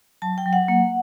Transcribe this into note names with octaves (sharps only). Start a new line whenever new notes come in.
F#3 A5
G5
F#3
F#5
A#3